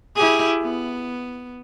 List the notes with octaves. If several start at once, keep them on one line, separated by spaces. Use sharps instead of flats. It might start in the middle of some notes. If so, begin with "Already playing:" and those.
E4 G4 G#4
B3